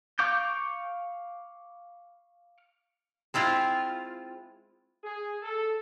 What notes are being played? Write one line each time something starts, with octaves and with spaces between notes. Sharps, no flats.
F5 C#6 D6 G6
G#3 C4 E4 F4
G#4
A4